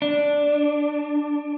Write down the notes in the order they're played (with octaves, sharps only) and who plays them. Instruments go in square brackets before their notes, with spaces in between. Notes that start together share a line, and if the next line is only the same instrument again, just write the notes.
[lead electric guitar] D4